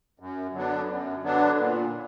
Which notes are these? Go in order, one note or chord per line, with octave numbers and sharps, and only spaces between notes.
F#2
D3 F#3 B3 D4
F#2
D3 F#3 B3 D4
A#2